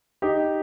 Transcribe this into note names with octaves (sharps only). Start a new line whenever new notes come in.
D#4 G4